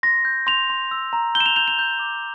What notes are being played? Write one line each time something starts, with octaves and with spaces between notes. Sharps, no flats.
C6 A#6
G6
C6 F7
C6
E6
A#5
G6 G7
E7
F7
G6 F7
F7
G6
D6